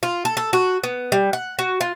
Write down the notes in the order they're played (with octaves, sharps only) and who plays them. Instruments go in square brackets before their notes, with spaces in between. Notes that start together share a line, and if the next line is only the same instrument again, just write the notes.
[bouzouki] F4
A4
A4
F#4
B3
G3
F#5
F#4
F4